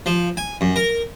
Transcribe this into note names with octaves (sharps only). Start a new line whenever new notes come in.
F3
G#5
F#2
A#4